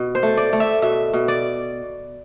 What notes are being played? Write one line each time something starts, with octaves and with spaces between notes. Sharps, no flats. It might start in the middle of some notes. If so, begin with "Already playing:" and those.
Already playing: B2
C5
A3
D5
A3
E5
B2 E5
B2
D5